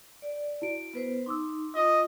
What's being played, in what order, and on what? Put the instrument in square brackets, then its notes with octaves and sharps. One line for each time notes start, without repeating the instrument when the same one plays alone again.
[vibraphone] D5
[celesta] E4 F#4 D7
[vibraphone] B3 B4 C5
[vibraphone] D#4 [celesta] C6 D6 E6
[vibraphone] F4 [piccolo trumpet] D#5